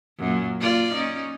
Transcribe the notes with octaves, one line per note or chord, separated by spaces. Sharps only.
F#2 A#2
A#3 F4 D5
C#4 D#4